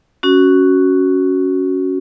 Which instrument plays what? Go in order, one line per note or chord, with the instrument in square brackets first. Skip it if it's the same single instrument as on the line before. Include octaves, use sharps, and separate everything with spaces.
[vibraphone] C#4 F#4